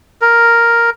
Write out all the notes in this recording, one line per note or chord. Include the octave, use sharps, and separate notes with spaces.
A#4